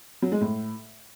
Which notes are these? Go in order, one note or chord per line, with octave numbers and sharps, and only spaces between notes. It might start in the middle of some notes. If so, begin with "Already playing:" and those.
F#3
G#3
A2